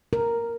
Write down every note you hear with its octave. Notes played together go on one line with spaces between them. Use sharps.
A#4